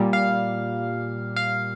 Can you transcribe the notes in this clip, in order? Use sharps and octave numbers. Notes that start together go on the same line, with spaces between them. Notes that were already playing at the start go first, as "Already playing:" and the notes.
Already playing: A#2 G3
F5
F5